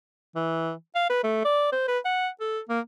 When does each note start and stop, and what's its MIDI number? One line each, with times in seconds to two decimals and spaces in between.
0.36 0.73 52
0.95 1.06 77
1.10 1.23 71
1.24 1.40 57
1.45 1.69 74
1.73 1.84 72
1.88 1.99 71
2.05 2.28 78
2.41 2.59 69
2.69 2.80 58